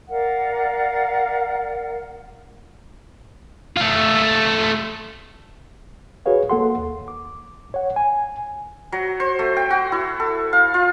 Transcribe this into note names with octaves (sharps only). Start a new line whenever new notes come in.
A#4 D5 F5 F#5
A3 F4
F#4 G#4 B4 C#5 F5
A#3 A4 F#5 C6
D#2
D6
C#5 F#5
G#5
F#3
C5
A3
G5
F#4
E4
A4
F5
F4